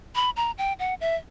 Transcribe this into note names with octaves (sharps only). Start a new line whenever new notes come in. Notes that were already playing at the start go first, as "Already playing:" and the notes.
B5
A#5
G5
F#5
E5